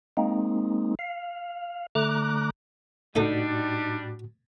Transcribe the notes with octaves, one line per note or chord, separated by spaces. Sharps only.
G#3 A#3 C4 D#4
F5
D3 A3 A#5 D6 F#6
C#2 A2 G3 A3 D4 D#4 F#4 A4